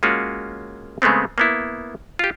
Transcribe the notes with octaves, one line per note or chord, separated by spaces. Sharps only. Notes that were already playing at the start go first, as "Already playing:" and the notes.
G#3 A#3 C#4 F4 F#4
C#3 G#3 A3 B3 C4
A#3 B3 E4
F4 G4